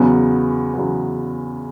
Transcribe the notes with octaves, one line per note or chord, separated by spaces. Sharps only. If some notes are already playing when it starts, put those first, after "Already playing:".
Already playing: E2 C#3 F#3 B3
E2 C#3 F#3 B3